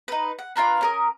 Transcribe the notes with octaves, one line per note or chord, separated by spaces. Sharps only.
D#4 B4
F#5
D4 F4 A#4 B4
C#4 A#4 D#6